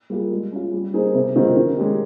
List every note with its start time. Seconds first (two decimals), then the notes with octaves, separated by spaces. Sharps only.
0.10 G3 A#3 F4 G#4
0.31 G#3
0.52 C#4 F4
0.73 G3
0.94 A#3 D#4 G#4 C5
1.14 C3
1.36 D#3 G#3 C4 F4
1.57 D#3
1.77 G#3 C#4 G4